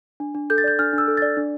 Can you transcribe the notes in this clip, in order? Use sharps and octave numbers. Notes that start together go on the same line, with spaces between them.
D4
D4
A4 G6
A6
D5 G6
D4 F6
D4
E6
A4
D5 A6
D4